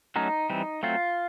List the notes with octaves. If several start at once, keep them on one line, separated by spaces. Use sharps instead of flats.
F#3 A3 C#4 D#4
E3 G3 C4
F#3 A3 C4 F4